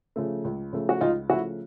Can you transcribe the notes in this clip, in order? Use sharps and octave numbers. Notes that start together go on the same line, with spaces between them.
C#3 F3 A3
C#2
C#3 F3 A3
F#4
C#2 D#4 F4
C#3 F3 A3 E4 F#4